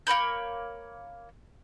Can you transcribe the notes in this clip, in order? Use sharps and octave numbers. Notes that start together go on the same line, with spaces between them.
A#3 C#5 B5 G6